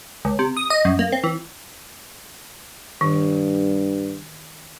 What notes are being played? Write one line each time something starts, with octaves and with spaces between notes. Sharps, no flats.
C#2
C3
D#6
D#5
F#2
A#3
C4
E3
G2 D#3